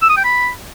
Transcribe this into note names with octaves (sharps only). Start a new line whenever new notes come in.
E6
D#6
G5
B5